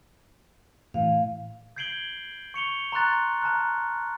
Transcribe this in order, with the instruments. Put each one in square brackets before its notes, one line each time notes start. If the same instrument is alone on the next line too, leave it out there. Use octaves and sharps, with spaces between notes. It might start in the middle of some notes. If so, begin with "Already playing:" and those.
[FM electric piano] A2 E3 [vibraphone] F5
[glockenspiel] G6 G#6 C7 D7 F#7 G7
C#6 C#7 F7 G7
A#5 C6 C#6 F#6 A6
A5 A#5 F6 F#6